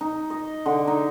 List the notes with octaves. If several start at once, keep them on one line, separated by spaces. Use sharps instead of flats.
D#4
D#5
D3
D#4